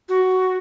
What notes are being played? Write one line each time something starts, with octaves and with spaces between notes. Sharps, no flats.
F#4